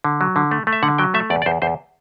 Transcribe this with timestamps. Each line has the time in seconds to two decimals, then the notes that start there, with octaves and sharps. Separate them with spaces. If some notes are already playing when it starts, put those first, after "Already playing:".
0.04 D3
0.21 F#3
0.36 D3
0.51 A3
0.67 A3
0.73 E5
0.83 D3 F#5
0.98 F#3 G5
1.14 A3 E5
1.30 E2 D5
1.42 D5
1.46 E2 C5
1.62 E2 C5